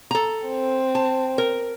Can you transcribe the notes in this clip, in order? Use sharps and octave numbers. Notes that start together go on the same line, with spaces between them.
A4 A#5
C4
A5
A#4